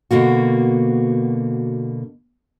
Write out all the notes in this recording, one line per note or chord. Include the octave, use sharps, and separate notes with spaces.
B2 D3 A#3 F#4